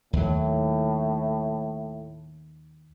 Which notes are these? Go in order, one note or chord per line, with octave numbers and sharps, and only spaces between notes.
D#2 A2 F#3